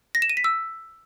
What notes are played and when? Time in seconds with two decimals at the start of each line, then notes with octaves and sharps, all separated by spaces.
0.15 A#6
0.22 E7
0.30 D#7
0.37 B6
0.44 E6